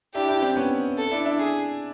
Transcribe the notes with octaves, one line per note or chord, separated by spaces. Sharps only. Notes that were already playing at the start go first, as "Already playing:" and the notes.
D4 E4 G4
D4 E4
C4 D4
B3 C#4
A4
D4 E4
D4 E4
G#4